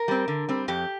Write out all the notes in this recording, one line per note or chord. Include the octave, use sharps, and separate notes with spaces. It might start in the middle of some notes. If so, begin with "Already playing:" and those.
Already playing: A#4
G3 C4
D3
G3 C4
F2 G4